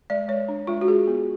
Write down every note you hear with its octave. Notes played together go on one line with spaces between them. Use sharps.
G#3 D5
G#3 C#5
D4
G#3 F4
F#4
G#3 G#4
B3